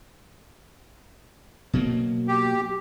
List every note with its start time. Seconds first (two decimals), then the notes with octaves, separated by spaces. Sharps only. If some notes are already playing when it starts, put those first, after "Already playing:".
1.73 B2 F#3 A#3
2.28 G4